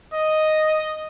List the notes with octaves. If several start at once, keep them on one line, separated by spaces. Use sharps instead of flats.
D#5